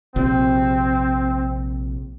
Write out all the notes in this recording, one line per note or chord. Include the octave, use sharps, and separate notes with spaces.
A#1 C3 C4